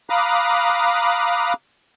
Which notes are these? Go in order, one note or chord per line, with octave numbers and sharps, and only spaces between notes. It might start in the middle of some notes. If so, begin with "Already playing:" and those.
F5 A#5 B5 D6 D#6 F#6